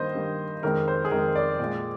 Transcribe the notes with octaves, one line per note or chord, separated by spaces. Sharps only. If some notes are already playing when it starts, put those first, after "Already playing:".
Already playing: G2 D#3 A#3 C5 D#5
G2 D#3 A#3
F2 D#3 G#3 A#4
C5
G#4
F2 D#3 G#3 A#4
D5
A#2 G#3